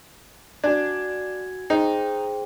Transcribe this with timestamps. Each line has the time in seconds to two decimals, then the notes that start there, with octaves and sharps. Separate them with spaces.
0.64 D4 F#4 G#5 G#6
1.70 D#4 G#4 C5 G5